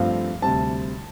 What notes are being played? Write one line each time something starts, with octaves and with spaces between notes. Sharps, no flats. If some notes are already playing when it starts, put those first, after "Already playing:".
Already playing: G2 F3 A3 C4 F5
D2 C3 G3 C4 A5